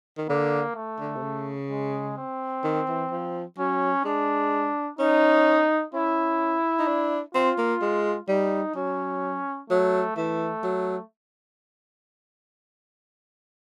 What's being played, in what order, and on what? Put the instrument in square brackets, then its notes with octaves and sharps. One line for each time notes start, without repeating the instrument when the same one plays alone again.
[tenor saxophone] D#3
[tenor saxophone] D3 [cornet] A#3
[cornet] A3
[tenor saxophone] D3
C3
C#3
[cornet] G#3
C4
[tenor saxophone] D#3
E3
F3
[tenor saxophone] F#3 [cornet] C#4
[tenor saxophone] G#3 [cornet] D4
[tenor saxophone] C#4 [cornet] D#4
[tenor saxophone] C#4 [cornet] E4
[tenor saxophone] D#4
D4
[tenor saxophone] C4 [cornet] F4
[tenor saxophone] A#3
G#3
[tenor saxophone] G3 [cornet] D#4
[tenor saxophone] F#3 [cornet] C#4
[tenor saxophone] F#3 [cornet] A3
[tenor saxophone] E3 [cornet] A3
[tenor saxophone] F#3